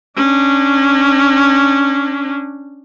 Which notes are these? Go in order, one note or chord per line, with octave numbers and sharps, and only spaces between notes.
C#4 D4